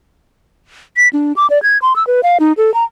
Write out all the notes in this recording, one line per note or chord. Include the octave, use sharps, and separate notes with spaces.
B6
D4
D6
D5
G#6
C6
E6
B4
F5
D#4
A4
A#5